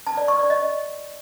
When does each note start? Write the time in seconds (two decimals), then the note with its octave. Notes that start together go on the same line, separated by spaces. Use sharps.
0.07 A5
0.17 D5
0.28 C#6
0.39 D5
0.50 D#5